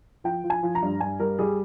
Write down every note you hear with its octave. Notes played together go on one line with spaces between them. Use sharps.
F3 G5
F3
G#5
F3
A#5
G2
G2 G#5
G3 A#4
G3 G#4